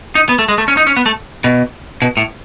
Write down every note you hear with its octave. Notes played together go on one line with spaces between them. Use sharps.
D#4
B3
A3
G#3
A3
C#4
D#4
C#4
B3
A3
B2
B2
A2